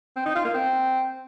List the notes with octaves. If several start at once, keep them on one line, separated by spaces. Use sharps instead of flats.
C4
D#4
F4
A#3
C4